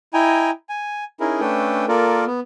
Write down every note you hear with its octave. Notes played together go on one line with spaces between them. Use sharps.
E4 D#5 G5 G#5 A#5
G#5
C#4 D#4 E4 G#4 A#4
A3 C#4 D4 A4 B4 G5
A#3 F4 A4 A#4 D5
B3